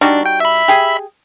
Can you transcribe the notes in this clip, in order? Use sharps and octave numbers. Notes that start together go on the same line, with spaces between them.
G3 D4 D#4 F#4
G5
E5 B5
G4 G#4